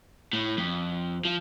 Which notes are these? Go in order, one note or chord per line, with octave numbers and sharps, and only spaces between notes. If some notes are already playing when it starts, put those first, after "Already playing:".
A2
F2
F3